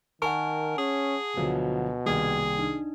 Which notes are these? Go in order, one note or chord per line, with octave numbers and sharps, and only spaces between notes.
D#3 A#4 F#5 G#5 A5 C#6
C#4 G#4
D2 B2 F3 F#3
C2 D#3 A#3 G#4 G5 G#6
D4 D#4